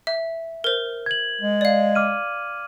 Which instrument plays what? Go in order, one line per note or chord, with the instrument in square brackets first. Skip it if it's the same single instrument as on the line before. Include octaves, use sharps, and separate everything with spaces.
[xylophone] E5
A#4 C5
[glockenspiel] G#6 F#7
[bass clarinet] G#3
[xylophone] D5 F5
[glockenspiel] D6 F6 D#7